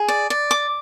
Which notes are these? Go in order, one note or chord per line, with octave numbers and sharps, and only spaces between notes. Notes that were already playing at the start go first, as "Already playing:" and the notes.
Already playing: G#4
D5
D5
D6